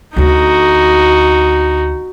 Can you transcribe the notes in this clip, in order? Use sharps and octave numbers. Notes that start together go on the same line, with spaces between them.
D2 D3 D#4 F#4